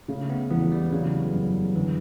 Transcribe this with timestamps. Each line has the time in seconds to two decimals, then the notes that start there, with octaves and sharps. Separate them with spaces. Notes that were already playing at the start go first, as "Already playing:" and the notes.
0.08 C#3 A3
0.30 B3
0.51 E2 B3
0.72 G3
0.92 C#3 F#3
1.34 F#2
1.75 D3 E3